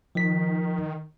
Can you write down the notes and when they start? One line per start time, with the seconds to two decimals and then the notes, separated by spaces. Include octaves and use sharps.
0.15 D#3 F3 B6